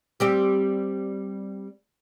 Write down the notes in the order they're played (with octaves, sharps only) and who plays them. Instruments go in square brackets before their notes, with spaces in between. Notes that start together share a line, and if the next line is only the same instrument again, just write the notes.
[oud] G3 C4 G4